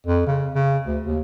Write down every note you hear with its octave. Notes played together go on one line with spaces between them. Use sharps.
F2
C#3
C#3
D2
D#2